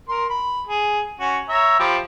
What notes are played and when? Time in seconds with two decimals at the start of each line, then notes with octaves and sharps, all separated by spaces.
0.09 A#4 C6
0.30 B5
0.67 G#4
1.20 C#4 F#4
1.49 C#5 E5 A#5
1.80 F3 G4 B5